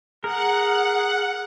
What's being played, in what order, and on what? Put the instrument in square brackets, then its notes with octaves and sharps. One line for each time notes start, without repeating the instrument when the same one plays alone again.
[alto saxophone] G#4 [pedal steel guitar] A#4 [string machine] F#5